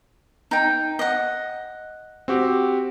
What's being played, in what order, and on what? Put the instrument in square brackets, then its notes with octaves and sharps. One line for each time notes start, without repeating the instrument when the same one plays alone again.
[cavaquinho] D#4 G5
D#5 F#5
[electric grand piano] C4 F#4 G4